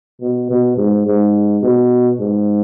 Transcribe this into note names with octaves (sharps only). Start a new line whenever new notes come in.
B2
B2
G#2
G#2
B2
G#2